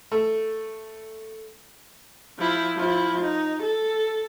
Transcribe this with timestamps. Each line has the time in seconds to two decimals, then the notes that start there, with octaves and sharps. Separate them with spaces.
0.12 A3
2.39 F3 E4
2.76 F3 E4
3.21 D#4
3.62 A4